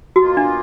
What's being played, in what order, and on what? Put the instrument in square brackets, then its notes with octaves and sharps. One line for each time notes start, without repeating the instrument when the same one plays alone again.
[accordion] B2 A#3 F4 [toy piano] F#4
[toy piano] D4